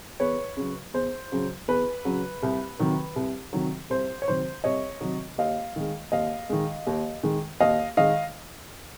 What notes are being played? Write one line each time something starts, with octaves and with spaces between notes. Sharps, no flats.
E2 B4 C#5
C#3 F#3
E2 C5
C#3 F#3
E2 B4
C#3 F#3
C2
C3 D#3 F#3
C2
C3 D#3 F#3
C2 C5
C#5
C3 D#3 F#3 C5
C2 C#5 D#5
C3 D#3 F#3
D#2 D#5 F5
D#3 G#3
D#2 D#5 F5
D#3 G#3
D#2
D#3 G#3
D#2 D#5 F5
D#3 G#3 D#5 F5